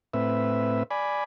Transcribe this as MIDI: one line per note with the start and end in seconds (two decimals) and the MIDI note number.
0.14 0.83 45
0.14 0.83 60
0.14 0.83 71
0.14 0.83 76
0.91 1.24 74
0.91 1.24 80
0.91 1.24 83